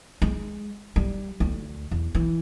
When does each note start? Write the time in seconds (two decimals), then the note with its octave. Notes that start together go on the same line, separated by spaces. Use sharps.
0.22 G#3
0.96 G3
1.40 D2
1.91 E2
2.15 E3